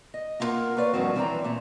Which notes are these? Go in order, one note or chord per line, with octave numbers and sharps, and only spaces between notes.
D#5
A#3 E4 F4 A#4 F5 F#5
A#3 B4 C#5 D5 F5
G2 A#2 D#3 F3 C4 F#4
F#2 E3 C4 D5 G5 A#5
A#2 A3